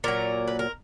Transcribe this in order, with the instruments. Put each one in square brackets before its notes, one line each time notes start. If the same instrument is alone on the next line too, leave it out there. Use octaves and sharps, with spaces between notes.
[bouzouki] A#2 F#3 A#4
B4
A#4